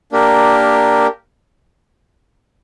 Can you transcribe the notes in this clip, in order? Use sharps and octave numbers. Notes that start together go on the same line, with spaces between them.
A#3 D4 G4 A#4